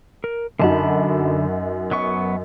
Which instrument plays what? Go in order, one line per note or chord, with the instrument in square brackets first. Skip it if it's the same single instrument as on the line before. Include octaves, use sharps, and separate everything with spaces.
[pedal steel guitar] A#4
[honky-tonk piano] F#2 D#4 F#4 [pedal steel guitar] D3 A5 B5
[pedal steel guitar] F#3 B3 C#6